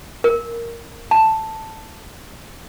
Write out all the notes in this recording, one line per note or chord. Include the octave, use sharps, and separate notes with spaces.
A#4
A5